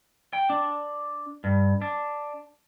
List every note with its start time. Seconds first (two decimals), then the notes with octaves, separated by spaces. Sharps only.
0.33 G5
0.50 D4
1.44 G2
1.81 D4